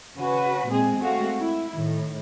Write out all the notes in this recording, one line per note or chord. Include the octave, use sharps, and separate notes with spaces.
C#3 C#4 F#4 B4
A#2 G#3 C4 G#4
G#3 A3 C4 F#4 F5
E4
A2 D#3